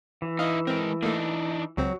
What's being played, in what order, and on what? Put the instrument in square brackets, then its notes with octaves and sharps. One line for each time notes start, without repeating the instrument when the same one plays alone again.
[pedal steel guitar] E3
[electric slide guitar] D#4 E4 [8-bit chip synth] D#5 F5
[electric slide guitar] G#3 A#4 [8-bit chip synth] C4
[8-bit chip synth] A3 A#3 [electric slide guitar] D4 D#4
[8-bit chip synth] C#2 C4 [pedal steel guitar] F#3